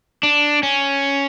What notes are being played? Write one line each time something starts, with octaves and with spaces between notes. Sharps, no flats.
D4
C#4